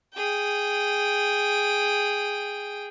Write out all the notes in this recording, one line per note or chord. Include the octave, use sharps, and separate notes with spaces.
G#4 G5